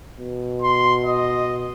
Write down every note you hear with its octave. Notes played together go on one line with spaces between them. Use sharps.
B2
C6
D#5